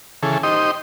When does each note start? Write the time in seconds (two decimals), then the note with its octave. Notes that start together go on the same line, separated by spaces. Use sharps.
0.23 C#3 E3 G#4 A4
0.43 D#4 G4 C5 D#5